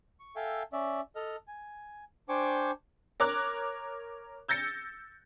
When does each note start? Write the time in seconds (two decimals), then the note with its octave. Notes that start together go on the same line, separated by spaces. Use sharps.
0.20 C#6
0.36 A4 E5 F5 G5 G#5
0.73 C#4 D5 E5
1.16 A4 D#5 F6
1.48 G#5
2.29 D4 C5 G5 G#5 C#6 D6
3.20 A#4 C#5 D6 F#6
4.48 E6 G6 A6 A#6 C#7